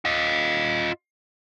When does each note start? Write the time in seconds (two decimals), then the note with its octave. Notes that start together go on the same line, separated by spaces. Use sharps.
0.05 F4 D#5